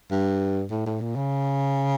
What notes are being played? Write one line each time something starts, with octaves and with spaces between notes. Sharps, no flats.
G2
A2
A2
A#2
C#3